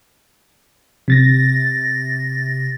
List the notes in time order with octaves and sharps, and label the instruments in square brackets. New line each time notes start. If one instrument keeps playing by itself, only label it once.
[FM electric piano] C3 A6 A#6